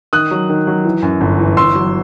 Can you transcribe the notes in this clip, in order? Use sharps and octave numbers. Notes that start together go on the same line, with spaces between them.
D#3 D#6 F#6
F#3
D#3
F#3
E3
F#2
G1
E3
G1 C6 E6
F#3